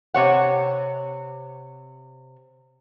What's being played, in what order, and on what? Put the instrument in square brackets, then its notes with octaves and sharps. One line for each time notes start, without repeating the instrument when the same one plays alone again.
[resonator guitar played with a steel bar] C3 C#5 F#5